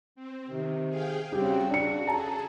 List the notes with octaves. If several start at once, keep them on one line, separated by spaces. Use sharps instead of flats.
C4
C3 D#3
G#4 F5 G5
C#3 G3 C4 F#4 G4
C#3 D4 F#4 C#7
G#4 A4 A5 A#5